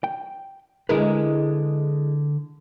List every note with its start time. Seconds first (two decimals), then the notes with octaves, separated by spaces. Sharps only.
0.04 G5
0.89 D3 G#3 E4 A#4 B4